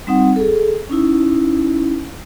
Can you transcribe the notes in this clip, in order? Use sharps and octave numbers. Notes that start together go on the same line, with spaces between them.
G3 C4 D#4 F#5
G#4 A4
C#4 D#4 E4